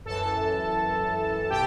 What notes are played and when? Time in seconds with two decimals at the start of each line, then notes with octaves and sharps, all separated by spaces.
0.05 F#2 E3 A4 A5
1.49 B2 G4 G5